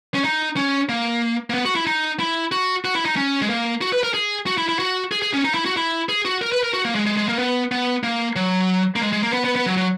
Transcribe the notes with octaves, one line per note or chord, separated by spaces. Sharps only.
C#4
D#4
C#4
A#3
A#3
B3
F#4
E4
D#4
E4
F#4
F#4
E4
D#4
C#4
G#3
A#3
F#4
B4
A#4
G#4
F#4
E4
E4
F#4
G#4
G#4
C#4
D#4
E4
F#4
E4
G#4
F#4
A#4
B4
A#4
F#4
A#3
G#3
G#3
G#3
A#3
B3
B3
A#3
F#3
A#3
G#3
G#3
A#3
B3
B3
B3
F#3
F#3